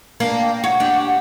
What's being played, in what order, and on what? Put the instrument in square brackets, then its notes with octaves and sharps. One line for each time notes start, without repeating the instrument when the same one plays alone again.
[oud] A#3 D4
[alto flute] G5
[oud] C#5 [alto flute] F#5
[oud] D4 G4